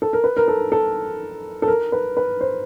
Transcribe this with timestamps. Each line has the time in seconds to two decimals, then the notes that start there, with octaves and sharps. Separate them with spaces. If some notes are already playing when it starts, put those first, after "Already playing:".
0.02 A4
0.13 A#4
0.24 B4
0.37 A#4
0.48 A4
0.72 A4
1.62 A4
1.68 A#4
1.92 B4
2.17 B4
2.41 C5